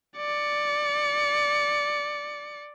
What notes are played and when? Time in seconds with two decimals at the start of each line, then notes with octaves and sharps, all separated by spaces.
0.17 D5 C#7